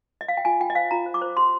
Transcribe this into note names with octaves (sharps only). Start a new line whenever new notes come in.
D#5
F5
G5
F4 G#5
F4 G5
D#5
C5 F5
F4 A#5
C5
D6
C5
G4 C6